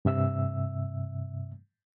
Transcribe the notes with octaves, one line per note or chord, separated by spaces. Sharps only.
G2 C3 E5 E6